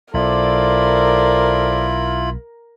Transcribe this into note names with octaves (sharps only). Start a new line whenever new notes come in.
B1 E4 F4 A4 A#4 C5 D5 B5